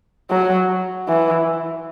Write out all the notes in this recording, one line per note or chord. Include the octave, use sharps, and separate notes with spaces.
F#3
E3